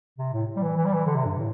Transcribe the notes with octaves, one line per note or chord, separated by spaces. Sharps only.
C3
A2
G3
E3
E3
G3
E3
D3
C3
G2
A2